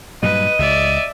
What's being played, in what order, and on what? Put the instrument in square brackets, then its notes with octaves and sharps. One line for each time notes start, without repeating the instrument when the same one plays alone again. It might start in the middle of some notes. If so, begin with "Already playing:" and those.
[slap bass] G2 A#2 F#3 [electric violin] B4 [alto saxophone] D#5 [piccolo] D#7
[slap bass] C#2 [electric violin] D5 E5